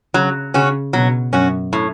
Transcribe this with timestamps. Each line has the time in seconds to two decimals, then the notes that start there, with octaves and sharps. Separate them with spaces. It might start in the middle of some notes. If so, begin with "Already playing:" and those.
0.14 C#3 F#3
0.54 C#3 C#4 F#4
0.93 B2 F#3
1.33 F#2 C#4 F#4
1.73 A2